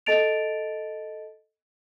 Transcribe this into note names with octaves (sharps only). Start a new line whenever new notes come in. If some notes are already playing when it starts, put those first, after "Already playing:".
A4 D#5 A5 A6 D7 F7